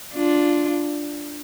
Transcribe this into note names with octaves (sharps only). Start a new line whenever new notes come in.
D4 F4